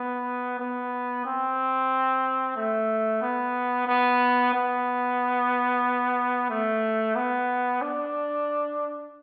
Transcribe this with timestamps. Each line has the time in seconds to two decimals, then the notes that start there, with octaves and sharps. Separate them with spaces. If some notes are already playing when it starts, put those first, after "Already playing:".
Already playing: B3
0.59 B3
1.25 C4
2.56 A3
3.22 B3
3.88 B3
4.53 B3
6.50 A3
7.16 B3
7.82 D4